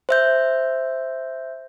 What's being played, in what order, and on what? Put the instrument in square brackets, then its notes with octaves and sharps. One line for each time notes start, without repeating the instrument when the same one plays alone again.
[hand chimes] C5 E5 G6